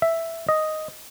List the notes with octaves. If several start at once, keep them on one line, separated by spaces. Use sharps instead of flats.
E5
D#5